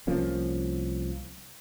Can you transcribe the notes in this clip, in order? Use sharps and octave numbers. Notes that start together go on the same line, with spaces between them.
C2 F3 A#3 C#4